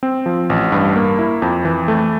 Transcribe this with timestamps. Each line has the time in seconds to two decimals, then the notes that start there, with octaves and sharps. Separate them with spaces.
0.03 C4
0.26 F3
0.50 A1
0.72 G2
0.96 A#3
1.19 E4
1.42 F2
1.65 E3
1.88 A3